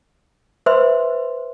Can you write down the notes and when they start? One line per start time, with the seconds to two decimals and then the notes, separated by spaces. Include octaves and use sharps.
0.66 B4 C5 E5 B5 C6